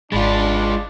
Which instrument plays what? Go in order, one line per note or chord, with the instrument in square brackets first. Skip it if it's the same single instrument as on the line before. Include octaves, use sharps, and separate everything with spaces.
[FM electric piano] G#1 B5 A6 [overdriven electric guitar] G#3 F4 [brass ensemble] D4